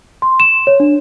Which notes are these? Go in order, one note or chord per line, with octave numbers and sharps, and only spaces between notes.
C6
E7
C#5
D4